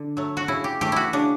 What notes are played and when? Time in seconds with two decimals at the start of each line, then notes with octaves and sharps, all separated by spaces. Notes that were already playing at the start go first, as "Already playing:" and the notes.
Already playing: D3
0.17 F#3 A3
0.37 F#4
0.48 C#3 E4
0.64 G4
0.81 E3 A3 G4
0.92 E4 F#4
1.13 C#3 D4